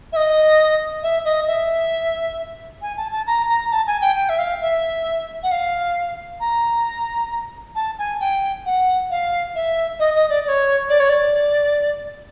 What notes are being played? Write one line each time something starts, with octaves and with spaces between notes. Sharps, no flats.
E5
D#5
E5
D#5
E5
G#5
A5
A5
A#5
A#5
A5
G#5
G5
G5
E5
F5
E5
F#5
F5
A#5
A5
G#5
G5
F#5
F5
E5
D#5
D#5
D5
D5
C#5
D5
C#5
D5